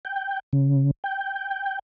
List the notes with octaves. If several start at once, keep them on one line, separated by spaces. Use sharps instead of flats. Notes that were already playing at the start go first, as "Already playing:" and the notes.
G5
C#3
G5